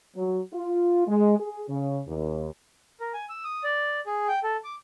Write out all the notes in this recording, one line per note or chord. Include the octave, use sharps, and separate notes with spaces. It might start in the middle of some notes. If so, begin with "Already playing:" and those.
F#3
F4
G#3
G#4
C#3
D#2
A#4
G#5
E6
D#6
D5
G#4
G5
A4
D6